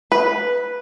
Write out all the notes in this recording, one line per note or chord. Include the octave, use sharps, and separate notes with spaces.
B4